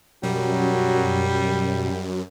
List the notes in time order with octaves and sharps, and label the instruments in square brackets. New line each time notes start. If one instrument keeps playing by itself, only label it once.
[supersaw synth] F#2 [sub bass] B2 [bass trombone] F#3 [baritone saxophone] G3